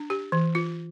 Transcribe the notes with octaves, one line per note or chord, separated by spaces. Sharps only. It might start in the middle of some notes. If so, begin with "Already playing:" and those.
Already playing: D4
G4
E3
F4